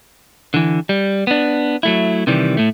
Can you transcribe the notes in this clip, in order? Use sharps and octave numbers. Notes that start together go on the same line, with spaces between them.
D3 E3
G3
B3 D4
F#3 A3 E4
C3 D#3 E3 G3
A2 A3